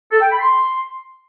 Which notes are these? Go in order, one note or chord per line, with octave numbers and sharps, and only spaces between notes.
A4
G5
B5
C6